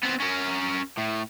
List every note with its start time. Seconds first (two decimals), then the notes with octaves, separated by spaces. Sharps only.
0.03 B3 C4
0.20 C#4 A#4
0.98 A2